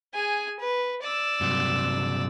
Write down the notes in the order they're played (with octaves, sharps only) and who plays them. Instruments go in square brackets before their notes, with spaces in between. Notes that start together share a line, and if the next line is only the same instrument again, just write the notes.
[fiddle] G#4 G#5
B4
D5 E6
[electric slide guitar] G2 C3 F#3